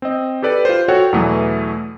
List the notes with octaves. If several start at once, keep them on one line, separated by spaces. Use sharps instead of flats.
C4 D#5
G4 A4 B4 D5
F4 C5
F#4 A4 C#5 F#5 G5
E2 B2 E3 F#3 A3